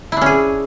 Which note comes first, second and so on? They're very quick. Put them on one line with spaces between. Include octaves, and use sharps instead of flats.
E4 D4 C#4 G#4